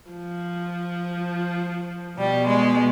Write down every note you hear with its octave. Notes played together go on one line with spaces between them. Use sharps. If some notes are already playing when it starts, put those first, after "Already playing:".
F3
B2 G3
G#3